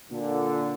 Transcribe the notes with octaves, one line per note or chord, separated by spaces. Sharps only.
A#2 D3